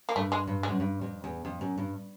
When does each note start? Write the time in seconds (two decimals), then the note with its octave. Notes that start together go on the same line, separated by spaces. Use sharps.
0.09 A#3
0.16 G2 A3
0.32 G#3
0.47 G2
0.63 G#3
0.69 F#2
0.80 G2
1.01 F2
1.24 E2
1.45 F2
1.61 F#2
1.78 G2